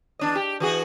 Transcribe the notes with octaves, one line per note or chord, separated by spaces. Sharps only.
E2 D4 D#5
G4
E3 F#4 G#4